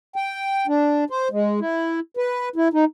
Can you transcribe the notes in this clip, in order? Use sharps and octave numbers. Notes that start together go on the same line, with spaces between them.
G5
D4
C5
G#3
E4
B4
E4
D#4